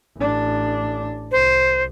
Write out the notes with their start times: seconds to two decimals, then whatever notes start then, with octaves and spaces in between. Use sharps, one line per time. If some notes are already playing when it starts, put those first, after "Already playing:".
0.17 A1 D4
1.32 C2 C5